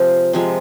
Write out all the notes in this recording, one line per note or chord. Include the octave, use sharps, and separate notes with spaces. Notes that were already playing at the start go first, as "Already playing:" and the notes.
Already playing: C3 F3 G#3 C5
C3 F3 G#3